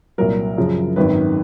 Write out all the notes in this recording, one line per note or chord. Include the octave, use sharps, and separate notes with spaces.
C2 A#2 F#3 A#4
F#2 C#3 F3
G#1 F#2 D#3 B4